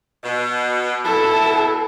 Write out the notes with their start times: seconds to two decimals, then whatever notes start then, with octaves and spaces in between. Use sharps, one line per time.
0.23 B2
1.05 B2 E4 A4